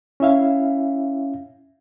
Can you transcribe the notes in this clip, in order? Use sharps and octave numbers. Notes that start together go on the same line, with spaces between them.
C#4 E4 E5 F5